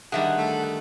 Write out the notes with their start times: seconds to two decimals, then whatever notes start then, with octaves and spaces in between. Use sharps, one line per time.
0.12 D3 D#3 G3 G#4 E5 F#5
0.37 A3